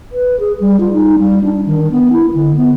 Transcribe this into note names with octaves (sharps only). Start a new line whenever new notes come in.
B4
G#4
G3
F4
D#4
G3
D4
D#3
B3
E4
D3
B3